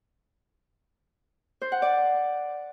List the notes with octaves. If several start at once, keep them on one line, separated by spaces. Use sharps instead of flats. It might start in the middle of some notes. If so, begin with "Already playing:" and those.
C5
F#5
D5